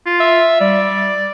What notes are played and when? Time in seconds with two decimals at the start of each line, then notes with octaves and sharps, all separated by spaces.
0.06 F4
0.20 E5
0.61 G3 D5